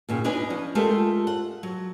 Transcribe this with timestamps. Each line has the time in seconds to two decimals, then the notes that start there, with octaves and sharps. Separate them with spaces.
0.09 D#2 A#2 C#3
0.24 B3 D4 D#4 B4 G#5
0.50 F3 C#4
0.75 G#3 A3 F4 G4 A4 A#4
1.27 F#5
1.63 F#3